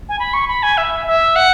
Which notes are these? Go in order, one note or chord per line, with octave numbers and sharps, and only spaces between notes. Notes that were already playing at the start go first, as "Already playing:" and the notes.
G#5
B5
C#6
B5
G#5
E5
E5
F#5